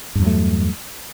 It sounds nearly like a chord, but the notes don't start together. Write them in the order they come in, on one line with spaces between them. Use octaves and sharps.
G2 E2 F#3 A3